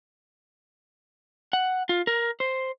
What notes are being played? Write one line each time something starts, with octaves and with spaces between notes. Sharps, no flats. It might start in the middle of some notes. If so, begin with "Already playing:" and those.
F#5
F4
A#4
C5